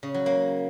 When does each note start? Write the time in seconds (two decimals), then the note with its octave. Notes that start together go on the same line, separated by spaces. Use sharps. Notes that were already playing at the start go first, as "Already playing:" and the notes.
0.03 C#3
0.14 F#3
0.26 A#3